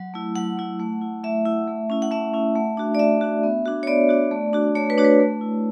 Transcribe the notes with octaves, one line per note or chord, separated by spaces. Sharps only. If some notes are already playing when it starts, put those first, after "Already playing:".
Already playing: F#3 F#5
A3 E4
F#3 F#5
A3 E4
A3
E4
A3 E5
E4
A3
C#4 E4
F#5
A3 E5
C#4 E4
A3
D4 F#4
D5
A3 E5
D4 F#4
B3
D4 F#4
C#5
B3 D5
D4 F#4
A3
D4 F#4
A3 C#5
B4
D4 F#4 C#5
B4
A3
E4